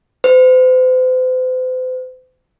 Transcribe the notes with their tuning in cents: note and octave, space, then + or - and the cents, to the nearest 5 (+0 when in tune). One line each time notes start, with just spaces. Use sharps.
C5 -40